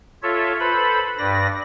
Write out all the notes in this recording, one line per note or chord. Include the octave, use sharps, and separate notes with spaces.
F4 A4 C#5 E5
A4 B4 C5 B5
G2 B4 D5 A#6